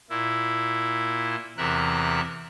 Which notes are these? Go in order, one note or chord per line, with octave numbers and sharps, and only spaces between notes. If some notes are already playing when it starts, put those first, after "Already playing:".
A#2 E4
E2 C3 A#4 E5 F#6